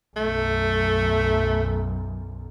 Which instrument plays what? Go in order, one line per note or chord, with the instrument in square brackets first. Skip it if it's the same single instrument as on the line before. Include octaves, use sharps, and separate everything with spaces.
[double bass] B1 F#2 [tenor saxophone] A3